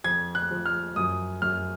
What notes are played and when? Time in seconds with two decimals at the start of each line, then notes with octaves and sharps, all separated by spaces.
0.04 F2 G#6
0.35 F#6
0.51 F3
0.66 F6
0.96 F#2 D#6
1.42 F#2 F6